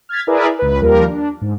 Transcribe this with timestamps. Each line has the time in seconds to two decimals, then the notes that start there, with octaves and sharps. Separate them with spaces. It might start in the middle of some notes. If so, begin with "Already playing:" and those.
0.09 F6 G#6 A6 B6
0.27 E4 G#4 A#4 B4 D5 E5
0.59 C#2 B4
0.81 D#2 F3 G3 A#3 A#4
1.07 D4
1.42 G#2